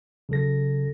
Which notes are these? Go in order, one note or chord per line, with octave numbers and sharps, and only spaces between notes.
C#3 F#3 A4 A#6